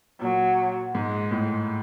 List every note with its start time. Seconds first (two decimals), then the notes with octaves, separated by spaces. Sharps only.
0.21 A#2 F#3
0.95 G#2 G#3
1.31 A2